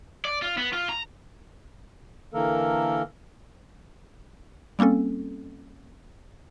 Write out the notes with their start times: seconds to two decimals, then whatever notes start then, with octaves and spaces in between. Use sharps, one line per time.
0.25 D5
0.42 F4
0.57 B3
0.73 F4
0.89 A#5
2.34 D3 E3 A#3 A4 A#4
4.79 G3 A#3 C4 C#4 A4